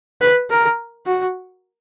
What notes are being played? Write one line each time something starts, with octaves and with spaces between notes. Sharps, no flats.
B4
A#4
F#4